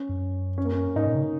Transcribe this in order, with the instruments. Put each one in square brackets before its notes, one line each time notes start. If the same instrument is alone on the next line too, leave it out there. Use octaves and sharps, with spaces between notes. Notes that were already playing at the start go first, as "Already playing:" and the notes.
Already playing: [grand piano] C#4
[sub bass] F#2
[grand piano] C#4
A#3
C#4
[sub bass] G#2 [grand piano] D#4
[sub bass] A#2
C#3